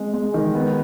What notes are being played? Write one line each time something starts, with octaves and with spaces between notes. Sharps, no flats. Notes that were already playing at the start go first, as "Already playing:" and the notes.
Already playing: G#3 C4
G#3
D#3
B3